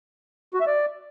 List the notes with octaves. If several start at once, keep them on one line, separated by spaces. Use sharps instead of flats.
F#4
E5
D5